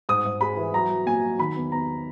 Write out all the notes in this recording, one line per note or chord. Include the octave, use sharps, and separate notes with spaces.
G#2 D#6
G#2
G#3 B5
E3
F#3 A#5
F#3
A#2 G#5
F#3
D#3 B5
E2
E2 A#5